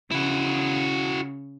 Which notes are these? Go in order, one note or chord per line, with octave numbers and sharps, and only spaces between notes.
C#3 E4 F#4